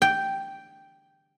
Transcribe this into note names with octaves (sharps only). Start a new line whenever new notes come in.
G5